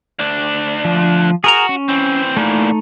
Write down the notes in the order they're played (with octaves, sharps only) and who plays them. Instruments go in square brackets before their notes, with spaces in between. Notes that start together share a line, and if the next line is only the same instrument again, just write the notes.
[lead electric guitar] D2 D4
[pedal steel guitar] F3
[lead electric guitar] F#4 [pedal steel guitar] G#4 A#4 A#5
[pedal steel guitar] C#4
[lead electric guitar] E3 C4
[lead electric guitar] A#2 E3 [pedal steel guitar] A3 D#4